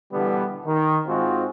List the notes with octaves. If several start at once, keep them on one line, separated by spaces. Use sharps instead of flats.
B2 D3 E3 G3 B3
D#3
G#2 G#3 C4 F4 F#4